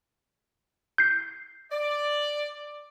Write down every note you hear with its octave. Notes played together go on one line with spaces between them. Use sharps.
G6 C7
D5